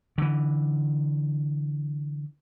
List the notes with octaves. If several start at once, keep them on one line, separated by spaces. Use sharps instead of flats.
D3 E3